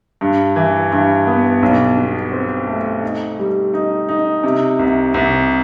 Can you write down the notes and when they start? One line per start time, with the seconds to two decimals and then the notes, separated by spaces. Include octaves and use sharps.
0.21 G2
0.56 E3
0.92 G2
1.27 B3
1.63 B1
1.97 B2
2.32 C4
2.67 A3
3.03 D#4
3.39 G3
3.74 D#4
4.09 D#4
4.43 C3
4.79 C2
5.14 C2